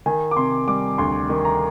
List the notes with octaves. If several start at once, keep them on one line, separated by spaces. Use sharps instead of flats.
D#3 G#5
D6
C3 C6
G3 D6
D2 C6
D#3
A#5